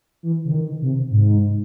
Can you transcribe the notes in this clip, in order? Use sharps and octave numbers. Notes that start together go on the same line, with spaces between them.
E3
C#3
D#3
C3
G#2